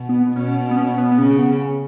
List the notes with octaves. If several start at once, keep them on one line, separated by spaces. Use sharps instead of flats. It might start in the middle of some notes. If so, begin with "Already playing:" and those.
Already playing: B2
B3
B3
B2 C#4
B3
C#4
B3
B3
C#3 C#4
B3
C#4